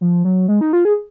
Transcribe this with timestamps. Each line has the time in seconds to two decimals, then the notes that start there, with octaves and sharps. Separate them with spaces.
0.01 F3
0.25 F#3
0.48 G#3
0.61 D#4
0.73 F4
0.85 G#4